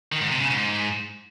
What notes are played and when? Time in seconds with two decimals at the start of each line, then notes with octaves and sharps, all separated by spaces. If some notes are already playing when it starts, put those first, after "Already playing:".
0.12 D#3
0.21 G#2
0.31 C3
0.40 C#3
0.50 G#2